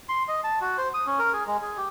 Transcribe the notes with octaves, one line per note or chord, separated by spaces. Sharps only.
C6
D#5
A5
F#4
C5
D#6
C#4
A#4
G#4
G#3
G#4
G4